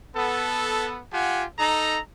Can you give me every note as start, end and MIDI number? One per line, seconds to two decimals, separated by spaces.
0.15 0.99 59
0.15 0.99 69
1.12 1.44 65
1.12 1.44 67
1.12 1.44 78
1.12 1.44 80
1.58 1.99 63
1.58 1.99 69
1.58 1.99 82